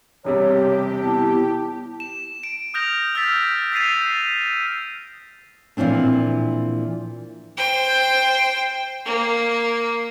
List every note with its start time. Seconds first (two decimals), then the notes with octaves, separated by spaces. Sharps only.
0.25 E1 C3 G3 G4 C#5
1.02 B3 E4 A5
2.00 E7
2.43 D7
2.74 D#6 F6 G6 A#6 F7
3.15 E6 F6 G6 A6 B6
3.72 G6 A6 B6 C7 D#7 F7
5.77 A#2 E3 F3 C4 D4
7.57 C5 G5
9.05 A#3